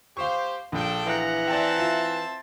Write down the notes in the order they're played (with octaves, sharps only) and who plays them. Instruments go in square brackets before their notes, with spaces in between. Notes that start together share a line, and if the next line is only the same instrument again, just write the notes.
[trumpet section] G4 C5 [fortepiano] F5 C#6
[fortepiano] A#1 [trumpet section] D4 A4 G5
[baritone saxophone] E3 [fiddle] F#5 A#5
[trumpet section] C4 E5 A5 [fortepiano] D5 G5
[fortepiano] F4